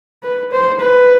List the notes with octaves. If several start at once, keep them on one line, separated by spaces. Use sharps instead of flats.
B4
C5
B4